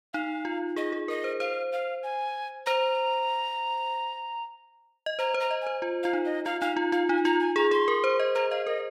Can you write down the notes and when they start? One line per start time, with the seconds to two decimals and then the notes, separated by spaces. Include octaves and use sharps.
0.13 D#4 F5
0.45 F4
0.76 G#4 D#5
0.92 G#4
1.08 A#4 D#5
1.24 C5
1.40 C5 F5
1.72 F5
2.03 G#5
2.66 C5 A#5
5.06 D#5
5.19 C5 A#5
5.34 C5
5.40 A#5
5.51 D#5
5.62 C5 G#5
5.82 F4
6.03 F4 F5
6.13 D#4
6.25 D#5
6.45 F4 F5
6.61 D#4 F5
6.77 F4
6.92 F4 F5
7.08 D#4 G#5
7.25 F4 A#5
7.40 G#5
7.56 G#4 A#5
7.71 G#4 C6
7.88 A#4
8.04 C5
8.20 D#5
8.35 C5 A#5
8.51 D#5 F5
8.67 A#4 D#5